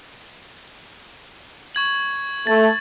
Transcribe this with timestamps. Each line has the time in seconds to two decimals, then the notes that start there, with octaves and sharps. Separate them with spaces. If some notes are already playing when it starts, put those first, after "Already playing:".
1.75 C#6 G#6 F#7
2.47 A3 A6